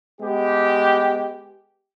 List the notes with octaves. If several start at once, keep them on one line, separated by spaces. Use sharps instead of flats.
G#3 B3 G4